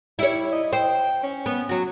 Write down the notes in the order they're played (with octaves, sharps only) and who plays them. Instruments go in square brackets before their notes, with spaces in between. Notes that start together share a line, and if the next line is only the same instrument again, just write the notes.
[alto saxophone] G3 [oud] E4 C#5
[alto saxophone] D#5
[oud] C5 [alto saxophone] G5
[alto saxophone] C#4
[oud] B3
F#3 F#4